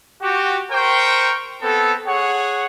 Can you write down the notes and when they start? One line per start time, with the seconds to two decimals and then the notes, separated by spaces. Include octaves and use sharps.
0.21 F#4 G4
0.71 A#4 C5 G5 C#6
1.62 B3 C4 A4
2.07 G#4 C#5 F#5